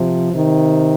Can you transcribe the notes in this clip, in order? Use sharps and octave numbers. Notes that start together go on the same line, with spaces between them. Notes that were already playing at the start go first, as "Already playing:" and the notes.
Already playing: C3 F3
C3 D#3